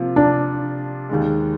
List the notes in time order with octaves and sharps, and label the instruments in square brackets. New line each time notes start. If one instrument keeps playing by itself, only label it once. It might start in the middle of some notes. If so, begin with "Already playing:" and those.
Already playing: [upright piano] C3 F3 A#3 F4
[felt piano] D4
[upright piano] D#2 D#3 G#3